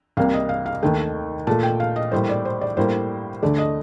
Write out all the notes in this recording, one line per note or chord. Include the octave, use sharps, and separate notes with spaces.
C2 C3 G3 A#3 F5
D#5
F5
F5
D#2 D#3 A3 G5
A#2 A3 A5
G5
F5
D#5
A2 G3 A#3 C5
D5
C5
D5
A2 G3 A#3 C5
D2 D3 A3 D5
D#5